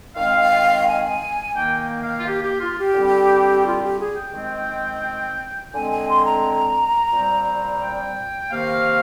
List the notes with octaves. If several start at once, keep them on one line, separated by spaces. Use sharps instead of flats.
D#3 G#3 C4 F5
G#5
D#3 A#3 G5
G5
F5
F4
G4
G4
F4
G4
D3 G3 C4
F4
G4
G#4
G5
D#3 G#3 C4
D3 G#3 C4 G#5
G#5
C6
A#5
A#2 G3 C4
G5
C3 D#3 A#3 F5